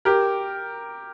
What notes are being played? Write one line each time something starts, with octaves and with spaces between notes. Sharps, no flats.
G4 A#4